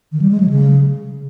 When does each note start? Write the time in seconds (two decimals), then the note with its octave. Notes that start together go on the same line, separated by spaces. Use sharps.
0.12 D#3
0.21 G3
0.31 G#3
0.40 F#3
0.50 C#3